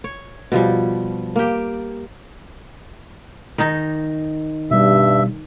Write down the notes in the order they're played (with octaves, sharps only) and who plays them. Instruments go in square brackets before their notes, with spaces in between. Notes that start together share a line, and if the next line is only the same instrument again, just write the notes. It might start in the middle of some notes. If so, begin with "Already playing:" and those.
[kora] C#5
B2 F3 G3
A#3 G4
D#3 D#4
[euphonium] G2 [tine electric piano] B2 G3 [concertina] E5